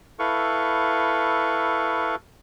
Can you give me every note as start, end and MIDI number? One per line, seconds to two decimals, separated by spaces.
0.19 2.15 64
0.19 2.15 69
0.19 2.15 71
0.19 2.15 77
0.19 2.15 85